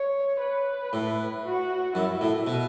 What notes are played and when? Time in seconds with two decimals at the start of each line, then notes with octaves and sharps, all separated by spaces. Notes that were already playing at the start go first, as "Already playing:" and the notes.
Already playing: C#5
0.41 B4
0.93 A2
1.45 F#4
1.95 F#2 E4
2.21 A2
2.47 B2